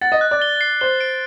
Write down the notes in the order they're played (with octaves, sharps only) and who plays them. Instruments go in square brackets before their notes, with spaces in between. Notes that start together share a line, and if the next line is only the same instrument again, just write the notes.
[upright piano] F#5 [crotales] A6
[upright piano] D#5
[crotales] F#6
[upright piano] D5
[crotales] G7
C7
[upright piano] C5 [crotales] G7
[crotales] D7